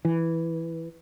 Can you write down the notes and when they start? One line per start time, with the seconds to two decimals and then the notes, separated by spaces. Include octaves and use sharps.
0.05 E3